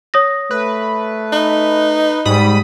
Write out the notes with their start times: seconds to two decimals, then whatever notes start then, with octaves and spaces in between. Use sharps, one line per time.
0.14 C#5 D#6 A#6
0.51 A3 B4
1.33 D#4
2.25 G#2 G3 B5 D#6